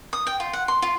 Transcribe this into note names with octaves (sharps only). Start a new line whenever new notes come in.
D#6
G5
F4
F#5
C6
F4